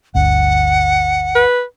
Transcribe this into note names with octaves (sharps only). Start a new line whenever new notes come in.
G1 D2 F#5
B4